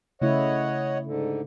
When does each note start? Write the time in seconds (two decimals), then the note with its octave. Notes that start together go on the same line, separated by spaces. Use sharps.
0.22 C#3 A3 E4 C#5 D#5 F#5
1.05 G#2 D3